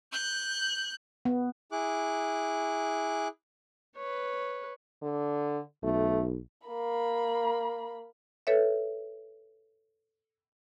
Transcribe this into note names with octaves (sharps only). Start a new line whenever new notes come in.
F#6 G6
B3
E4 G#4 D6 F#6
B4 C#5
D3
B1 A3
A#3 B5
A4 B4 C#5 E5